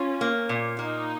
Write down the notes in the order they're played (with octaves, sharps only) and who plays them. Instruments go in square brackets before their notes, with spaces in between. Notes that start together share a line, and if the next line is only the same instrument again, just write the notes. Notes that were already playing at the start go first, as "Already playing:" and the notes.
Already playing: [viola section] C#4 [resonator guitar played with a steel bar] F4
[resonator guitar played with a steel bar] A#3
A#2
[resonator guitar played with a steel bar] A#3 [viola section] D#4